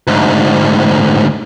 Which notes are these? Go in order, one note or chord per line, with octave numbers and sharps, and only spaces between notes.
D2 G#2